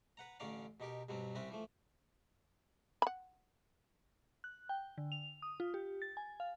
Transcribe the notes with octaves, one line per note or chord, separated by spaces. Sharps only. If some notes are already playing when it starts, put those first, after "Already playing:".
B4 F#5 A#5
A1 D3 C#4 D5 F5 A#5
B2 D#4 G4 A#4
G2 B2 F#3 G3 C4
C2 G3 C4 C#4 B4 E5
E3 F3 A3
F#5 B5
F#6
G5
D3
F7
D#6
F4
G4
A6
G#5
F5